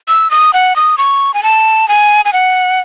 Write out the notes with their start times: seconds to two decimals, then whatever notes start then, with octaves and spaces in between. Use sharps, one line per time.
0.08 E6
0.31 D#6
0.53 F#5
0.76 D#6
0.98 C#6
1.34 G#5
1.43 A5
1.88 G#5
2.25 G#5
2.33 F#5